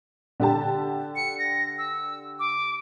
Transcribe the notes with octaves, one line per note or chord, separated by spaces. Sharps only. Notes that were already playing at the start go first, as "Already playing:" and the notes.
D3 G4 A5
C#7
A#6
E6
D6